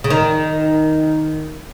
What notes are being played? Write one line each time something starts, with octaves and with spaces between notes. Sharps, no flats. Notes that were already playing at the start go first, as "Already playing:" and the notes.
C#3
D#3